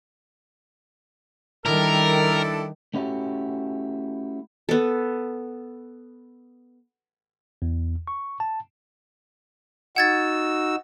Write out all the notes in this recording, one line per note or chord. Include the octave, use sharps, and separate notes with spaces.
D#3 G3 D4 E4 A4 A#4
A3 C#4 D#4 E4 F#4 G4
B3 A4
E2
C#6
A5
D#4 F#4 F#5 E6 G#6 A6